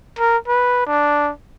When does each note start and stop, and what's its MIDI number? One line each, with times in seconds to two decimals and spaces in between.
0.19 0.37 70
0.48 0.84 71
0.86 1.31 62